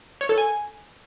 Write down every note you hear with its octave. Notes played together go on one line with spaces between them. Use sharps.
C#5
A4
G#5